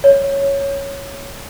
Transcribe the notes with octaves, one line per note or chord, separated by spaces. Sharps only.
C#5